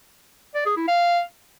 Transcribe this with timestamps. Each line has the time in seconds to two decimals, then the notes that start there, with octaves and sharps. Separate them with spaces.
0.55 D5
0.66 G#4
0.77 E4
0.88 F5